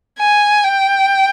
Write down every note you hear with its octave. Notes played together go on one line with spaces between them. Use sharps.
G#5
G5